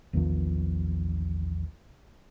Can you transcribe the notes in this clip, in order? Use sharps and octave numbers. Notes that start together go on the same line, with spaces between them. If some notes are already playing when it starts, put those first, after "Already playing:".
A#1 E2 D#3 F3